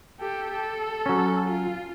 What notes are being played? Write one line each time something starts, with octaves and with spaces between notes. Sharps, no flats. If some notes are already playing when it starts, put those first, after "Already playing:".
G4 A4
A4
F#3 C#4
F4